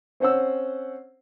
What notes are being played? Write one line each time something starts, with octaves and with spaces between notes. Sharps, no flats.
C4 C#4 C5 F#5 E6